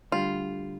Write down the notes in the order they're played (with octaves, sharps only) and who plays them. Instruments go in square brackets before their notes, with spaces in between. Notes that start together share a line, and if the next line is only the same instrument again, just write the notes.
[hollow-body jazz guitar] D2 D3 G3 [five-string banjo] F4